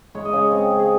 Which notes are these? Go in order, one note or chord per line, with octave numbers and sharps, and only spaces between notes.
G#3 C#5
D#5
C#3 C#5
C4
C#3
G#4